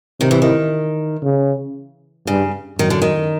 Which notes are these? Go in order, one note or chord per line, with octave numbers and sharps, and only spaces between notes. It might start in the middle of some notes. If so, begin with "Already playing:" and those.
C3 D#3
E3
D#3
C#3
G2 C#3
F#2 D#3
D3
D#3